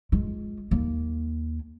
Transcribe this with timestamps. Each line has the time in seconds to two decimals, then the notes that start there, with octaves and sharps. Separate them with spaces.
0.12 G#3 F4
0.71 D#2 A#3